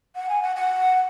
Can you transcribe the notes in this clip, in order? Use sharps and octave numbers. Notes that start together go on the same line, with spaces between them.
F#5
G#5
F#5
F#5